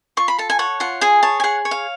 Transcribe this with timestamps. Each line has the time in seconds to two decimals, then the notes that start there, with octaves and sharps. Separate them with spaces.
0.17 F4 C#6
0.28 B5
0.38 A4 A5
0.50 G#5
0.59 C#5 F#5
0.80 F4 F#5
1.01 G#4 G#5
1.23 C#5 A5
1.40 G#5
1.44 G#4 F#5
1.65 C#5
1.71 F5